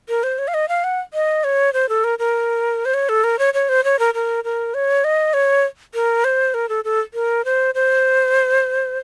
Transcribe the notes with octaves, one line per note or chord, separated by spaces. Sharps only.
A#4
C5
C#5
F5
D#5
F5
F#5
D#5
C#5
C5
A4
A#4
A#4
C5
C#5
A4
A#4
C#5
C#5
C5
C#5
A#4
A#4
A#4
C#5
D#5
C#5
A#4
C5
A#4
A4
A4
A#4
C5
C5